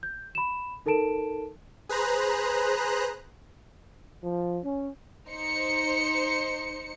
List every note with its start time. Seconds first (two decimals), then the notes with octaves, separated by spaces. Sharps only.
0.03 G6
0.35 B5 E7
0.86 D#4 A4 A#4 A5 D7 E7
1.89 G#4 B4 C5 A#5 F#6
4.23 F3
4.63 C#4
5.28 D#4 C5 C#7